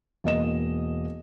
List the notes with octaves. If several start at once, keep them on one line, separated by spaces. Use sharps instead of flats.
E1 A#3 D#5 E7